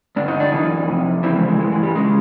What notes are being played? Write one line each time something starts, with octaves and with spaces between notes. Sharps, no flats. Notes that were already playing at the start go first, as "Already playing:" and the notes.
G2 D3 D4
D#4
D4
F#2 C#3 E3 D#4
F2 C3
F2 C#3 E3 C4
G#3
G#3
G2 E3 G#3
G#3
G3
C#3 G#3